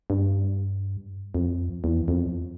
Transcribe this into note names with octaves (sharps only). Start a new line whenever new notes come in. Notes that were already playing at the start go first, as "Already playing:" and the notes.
G2
F2
E2
F2